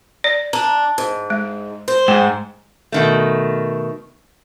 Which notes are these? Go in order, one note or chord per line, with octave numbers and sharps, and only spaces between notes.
D5
D4 A#5
G#2
G#3
C5
G#2 G5
B2 D#3 A3